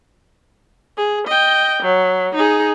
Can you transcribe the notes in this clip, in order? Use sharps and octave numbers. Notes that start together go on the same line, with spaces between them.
G#4
D#5 G5
F#3
D#4 G#4